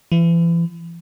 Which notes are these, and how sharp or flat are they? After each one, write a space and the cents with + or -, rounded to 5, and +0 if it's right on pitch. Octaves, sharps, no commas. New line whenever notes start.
E3 +35